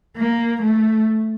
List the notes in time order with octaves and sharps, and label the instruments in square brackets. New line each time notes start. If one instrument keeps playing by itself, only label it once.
[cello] A#3
A3